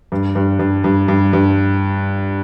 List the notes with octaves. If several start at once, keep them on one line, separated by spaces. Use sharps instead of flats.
G2
G2
G2
G2
G2
G2